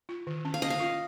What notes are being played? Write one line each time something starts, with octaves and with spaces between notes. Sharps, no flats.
F4
D#3
C#4
F5
C#4 D#5
F5
F4